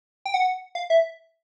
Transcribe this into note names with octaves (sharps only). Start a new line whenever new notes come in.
G5
F#5
F5
E5